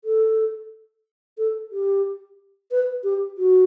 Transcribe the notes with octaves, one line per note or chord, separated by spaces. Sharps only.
A4
A4
G4
B4
G4
F#4